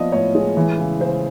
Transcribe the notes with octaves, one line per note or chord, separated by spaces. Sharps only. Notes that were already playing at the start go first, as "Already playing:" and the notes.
Already playing: F3 A#3 B3 D5 D#5
A2 C#5
G#3
E3
C#3
C#3 C5